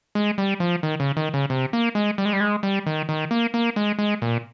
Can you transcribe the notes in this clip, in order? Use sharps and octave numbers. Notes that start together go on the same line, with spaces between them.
G#3
G3
F3
D#3
C#3
D#3
C#3
C3
A#3
G#3
G3
G#3
G3
G#3
G3
D#3
D#3
A#3
A#3
G#3
G#3
A#2